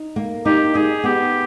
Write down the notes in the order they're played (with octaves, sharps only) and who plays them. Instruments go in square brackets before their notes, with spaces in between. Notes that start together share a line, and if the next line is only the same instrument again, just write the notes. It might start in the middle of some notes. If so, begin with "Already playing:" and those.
Already playing: [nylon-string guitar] D#4
A#3
[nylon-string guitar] D#4 [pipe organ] G4
[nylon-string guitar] D#4 [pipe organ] G#4
[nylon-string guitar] B3 [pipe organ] G4